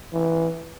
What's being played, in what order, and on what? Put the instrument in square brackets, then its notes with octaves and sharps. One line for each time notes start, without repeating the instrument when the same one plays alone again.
[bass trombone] E3